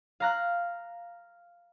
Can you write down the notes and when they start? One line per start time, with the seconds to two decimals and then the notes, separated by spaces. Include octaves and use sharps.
0.20 F5 A#5 F#6